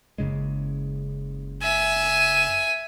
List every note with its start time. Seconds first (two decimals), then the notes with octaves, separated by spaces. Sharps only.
0.18 F#1 C#3 G#3
1.62 E5 G#5